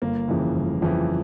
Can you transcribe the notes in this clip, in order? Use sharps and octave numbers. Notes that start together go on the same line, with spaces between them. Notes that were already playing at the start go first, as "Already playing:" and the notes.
G1 A#3
F2 C#3 E3
G1
F2 C#3 E3